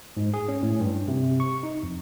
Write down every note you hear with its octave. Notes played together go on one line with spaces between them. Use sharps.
G#2
G#4
C#4
A2
G2
C3
C#6
D#4
F2